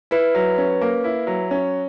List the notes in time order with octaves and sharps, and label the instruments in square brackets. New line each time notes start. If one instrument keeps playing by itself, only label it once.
[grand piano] E4 [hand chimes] B4
[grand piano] F#3
C#4
A#3
E4
F#3
C#4